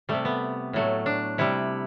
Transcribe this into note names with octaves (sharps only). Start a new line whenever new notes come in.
C3 G3 A3
B3
A2 F#3 A3
D4
C3 G3 E4